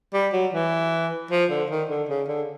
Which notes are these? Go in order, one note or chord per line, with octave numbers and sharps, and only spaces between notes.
G3
F#3
E3
F3
D3
D#3
D3
C#3
D3